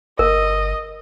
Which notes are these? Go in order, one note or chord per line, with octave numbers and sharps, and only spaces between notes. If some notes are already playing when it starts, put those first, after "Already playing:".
G1 A#4 D#5